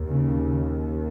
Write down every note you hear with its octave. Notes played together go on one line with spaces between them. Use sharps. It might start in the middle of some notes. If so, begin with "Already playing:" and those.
Already playing: D#2
C#3